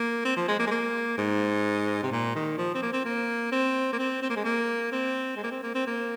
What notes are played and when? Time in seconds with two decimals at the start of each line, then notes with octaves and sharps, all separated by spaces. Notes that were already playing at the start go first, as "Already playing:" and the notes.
Already playing: A#3
0.25 C4
0.37 F3
0.48 G#3
0.59 A#3
0.67 G#3
0.71 A#3
1.18 G#2
2.03 C3
2.11 A#2
2.35 D#3
2.58 F3
2.74 C4
2.82 A#3
2.93 C4
3.05 A#3
3.52 C4
3.93 A#3
3.99 C4
4.22 C4
4.30 A#3
4.36 G#3
4.44 A#3
4.92 C4
5.37 G#3
5.43 A#3
5.51 C4
5.63 A#3
5.75 C4
5.87 A#3